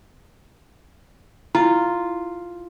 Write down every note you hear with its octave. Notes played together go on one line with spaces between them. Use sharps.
E4 F4